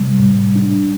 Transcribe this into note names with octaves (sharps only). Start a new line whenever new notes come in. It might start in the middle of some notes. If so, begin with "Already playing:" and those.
Already playing: C3 G3
A2
D4